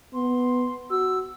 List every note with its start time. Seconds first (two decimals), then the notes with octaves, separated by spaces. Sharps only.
0.14 B3 C6
0.91 F#4 E6